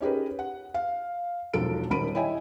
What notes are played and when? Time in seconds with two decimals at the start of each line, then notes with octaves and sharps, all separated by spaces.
0.01 C#4 D#4 G4 G#4 A#4 B4
0.39 F#5
0.74 F5
1.54 E1 B1 F3 F#4 A4 D7
1.90 D#1 D#3 B5 D7 D#7
2.15 E4 C#5 D#5 E5 G5 G#5